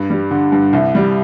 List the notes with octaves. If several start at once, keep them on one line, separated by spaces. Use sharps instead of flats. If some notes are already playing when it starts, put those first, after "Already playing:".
Already playing: G2
G3
D3
G2
C2
G3